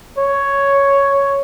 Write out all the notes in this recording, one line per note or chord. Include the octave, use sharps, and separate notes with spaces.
C#5